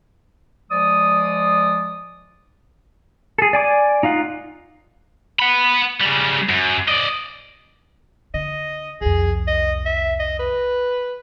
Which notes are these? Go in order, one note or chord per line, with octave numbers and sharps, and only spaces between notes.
F3 G#3 D5 D#6
G#4 A4
D5 G#5 D6
D#4 F4 F5 F#5
F#5 B5
C#3 G3
F#2
D5 D#5
D3 D#5
C2 F2 G#4
D#5
E5
D#5
B4